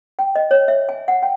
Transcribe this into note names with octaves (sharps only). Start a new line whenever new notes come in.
G5
D#5
C#5
E5
G#5
F#5
G5